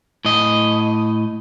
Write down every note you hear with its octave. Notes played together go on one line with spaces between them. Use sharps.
A2 D#5